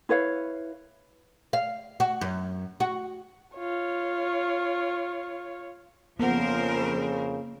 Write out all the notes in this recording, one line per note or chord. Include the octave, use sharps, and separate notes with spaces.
E4 B4 C#5 F5
F5
F#4
F#2
F#4
F4 C#5
F2 C#3 F3 A#3 B3 A#4 C5 F#5